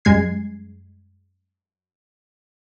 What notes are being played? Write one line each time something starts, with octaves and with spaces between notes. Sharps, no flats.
F#2 G3 G#3 G#6 C7